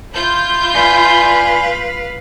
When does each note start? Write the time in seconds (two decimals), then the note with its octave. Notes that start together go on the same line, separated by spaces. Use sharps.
0.15 E4 F4 G6
0.74 B4 D5 F5 G#5 B5